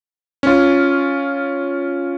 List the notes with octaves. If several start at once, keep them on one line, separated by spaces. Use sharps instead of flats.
C#4 F4